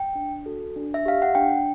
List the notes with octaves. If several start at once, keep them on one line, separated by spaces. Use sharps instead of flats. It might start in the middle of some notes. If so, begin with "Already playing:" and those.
Already playing: G5
D4
F#4 A4
D4
E5
G4 F5
F#5
D4 G5